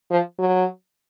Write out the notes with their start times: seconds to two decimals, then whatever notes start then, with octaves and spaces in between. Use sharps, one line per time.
0.11 F3
0.39 F#3